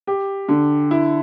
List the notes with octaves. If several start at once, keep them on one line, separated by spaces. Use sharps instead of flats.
G4
D3
E4